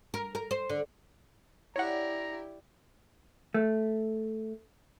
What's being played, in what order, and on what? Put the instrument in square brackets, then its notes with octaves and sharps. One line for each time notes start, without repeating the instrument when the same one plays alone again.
[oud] A#4
A#4
C5
D3
[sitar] D4 [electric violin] E4 G4 [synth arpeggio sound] C#5 F#5 [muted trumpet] A#5
[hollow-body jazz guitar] A3